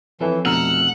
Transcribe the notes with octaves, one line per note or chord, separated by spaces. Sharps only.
E3 F3 C4 A4 B4 C#5 E5
F1 B2 F#5 A#5 E6 F6